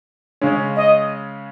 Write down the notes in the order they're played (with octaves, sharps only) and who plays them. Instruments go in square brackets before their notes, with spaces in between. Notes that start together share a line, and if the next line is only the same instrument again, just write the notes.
[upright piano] C#3 G#3 C#4
[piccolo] D#5